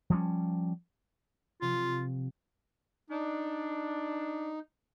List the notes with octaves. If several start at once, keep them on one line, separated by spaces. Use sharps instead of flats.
F3 G3 C#4
C3 F3 F4
D4 D#4